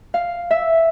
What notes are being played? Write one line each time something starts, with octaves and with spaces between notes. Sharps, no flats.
F5
E5